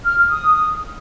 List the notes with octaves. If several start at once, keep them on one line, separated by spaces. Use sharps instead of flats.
F6
F6
D#6